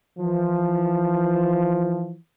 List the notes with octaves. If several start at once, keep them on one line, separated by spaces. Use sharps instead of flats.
E3 F3